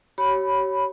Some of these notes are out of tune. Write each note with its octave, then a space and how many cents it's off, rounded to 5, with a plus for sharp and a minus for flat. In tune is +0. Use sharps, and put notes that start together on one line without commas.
G4 -40 C#5 +0 B5 +0